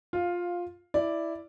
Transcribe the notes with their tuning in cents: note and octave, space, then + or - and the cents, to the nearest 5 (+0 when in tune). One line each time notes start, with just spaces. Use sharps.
F4 +10 F5 +0
E4 +0 D5 +0